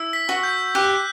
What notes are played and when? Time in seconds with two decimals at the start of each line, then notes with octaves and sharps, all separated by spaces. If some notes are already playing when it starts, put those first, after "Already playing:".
Already playing: E4 E6
0.13 B6
0.29 F#4
0.43 G6
0.75 G4 F#6